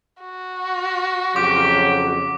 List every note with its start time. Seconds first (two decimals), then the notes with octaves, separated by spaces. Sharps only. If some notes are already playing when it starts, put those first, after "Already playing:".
0.21 F#4
1.36 F2 C#3 F#3 G4 D6